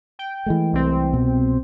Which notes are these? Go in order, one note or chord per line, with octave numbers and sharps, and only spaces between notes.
G5
E3 G#3 A3
C2 C4
B2